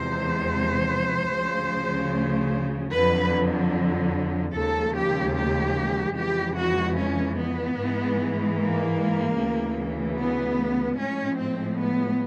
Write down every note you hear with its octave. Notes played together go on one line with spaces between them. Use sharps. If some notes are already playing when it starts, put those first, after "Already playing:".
Already playing: E2 C3 F3 G#3 C5
D2 C#3 F3
F2 D3 F#3 B4
D#2 C#3 F3 G#3 A4
G4
G4
F2 C#3 E3 G#3 G4
F#4
C#4
B3
G#2 E3 G#3
A#3
D2 C#3 E3
B3
A2 F3 G#3 C#4
C4
B3